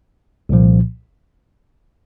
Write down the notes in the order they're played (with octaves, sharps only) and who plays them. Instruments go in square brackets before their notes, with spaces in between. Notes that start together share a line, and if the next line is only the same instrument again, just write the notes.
[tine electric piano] C2 A#2 F3